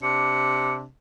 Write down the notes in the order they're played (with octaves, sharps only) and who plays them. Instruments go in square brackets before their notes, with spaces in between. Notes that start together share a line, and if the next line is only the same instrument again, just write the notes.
[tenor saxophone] C3 [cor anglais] D4 [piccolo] C#7